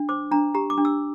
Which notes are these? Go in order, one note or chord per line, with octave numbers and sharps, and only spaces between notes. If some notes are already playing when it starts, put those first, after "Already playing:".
Already playing: D4
C5 D6
D4 A#5
G4 A#5
D6
D4
E6